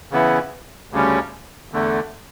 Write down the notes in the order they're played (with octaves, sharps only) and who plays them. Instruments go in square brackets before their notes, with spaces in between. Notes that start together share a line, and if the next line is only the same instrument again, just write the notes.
[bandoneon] C#3 E3 B3 E4
D2 C#3 G3 C#4
E2 D3 A3